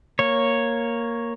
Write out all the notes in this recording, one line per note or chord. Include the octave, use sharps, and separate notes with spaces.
A#3 C#5